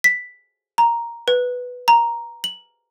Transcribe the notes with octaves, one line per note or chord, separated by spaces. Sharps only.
B6
A#5
B4
A#5
F#7